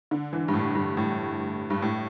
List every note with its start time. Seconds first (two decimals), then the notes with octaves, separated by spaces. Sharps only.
0.11 D3
0.33 E3
0.48 G2
0.54 A2
0.75 G2
0.97 A2
1.70 G2
1.82 A2